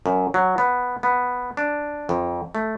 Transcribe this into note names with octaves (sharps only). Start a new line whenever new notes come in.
F#2
F#3
B3
B3
D4
F2
A3